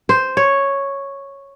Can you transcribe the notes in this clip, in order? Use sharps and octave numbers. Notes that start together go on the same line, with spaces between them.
C5
C#5